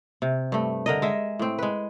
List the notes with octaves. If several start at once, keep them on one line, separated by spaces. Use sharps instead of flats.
C3
G2 A3
D3 A#4 D#5
G#3 E5
A2 C4
G#3 B4